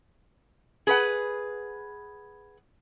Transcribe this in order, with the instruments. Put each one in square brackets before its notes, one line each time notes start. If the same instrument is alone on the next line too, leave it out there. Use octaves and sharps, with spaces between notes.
[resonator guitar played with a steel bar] G#4 B4 F#5